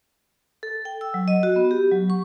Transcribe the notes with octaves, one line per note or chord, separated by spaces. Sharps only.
A4
G5
E6
F#3
D#5
F#4
B3
G4
F#3
C#6